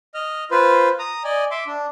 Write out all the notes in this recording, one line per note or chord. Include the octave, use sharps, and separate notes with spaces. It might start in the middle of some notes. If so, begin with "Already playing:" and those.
D#5 F6
F4 B4 C5
A#5 D#6
D5 D#5 G#5
E5 C6 D6
D4